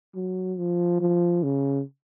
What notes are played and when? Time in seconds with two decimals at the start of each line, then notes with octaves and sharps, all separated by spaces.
0.15 F#3
0.58 F3
1.00 F3
1.43 C#3